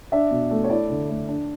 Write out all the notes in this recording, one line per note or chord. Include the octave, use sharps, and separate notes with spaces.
D4 E5
B2
A3
C#5
E4 D5
D3
A3
D4